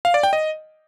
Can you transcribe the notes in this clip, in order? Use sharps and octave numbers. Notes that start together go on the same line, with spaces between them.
F5
D5
G5
D#5